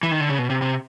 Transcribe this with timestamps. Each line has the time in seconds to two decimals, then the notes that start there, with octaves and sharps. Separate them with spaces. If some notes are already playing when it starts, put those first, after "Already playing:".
0.03 E3
0.11 D#3
0.20 D3
0.29 C#3
0.38 B2
0.50 C3
0.62 C3